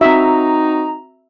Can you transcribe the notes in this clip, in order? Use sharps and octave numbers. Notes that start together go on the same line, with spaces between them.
C4 D#4 F#4 E5 A#5